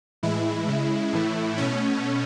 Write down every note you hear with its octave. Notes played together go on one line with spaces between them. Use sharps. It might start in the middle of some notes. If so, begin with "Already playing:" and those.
A2 E3 G#3 E4
C#3 G#3
A2 E3 A3
B2 A3 C#4